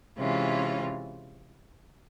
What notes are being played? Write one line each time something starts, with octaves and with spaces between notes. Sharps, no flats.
C3 E3 G#3 C#4 F4